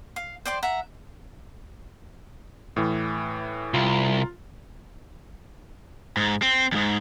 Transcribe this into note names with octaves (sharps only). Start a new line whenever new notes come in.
F5
C5 D5 G5 C6
E5 F#5 A#5
A2 E3
C2 F4
G#2
C4
F2 G#2